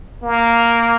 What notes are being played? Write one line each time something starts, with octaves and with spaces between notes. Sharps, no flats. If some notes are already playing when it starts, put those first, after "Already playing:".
A#3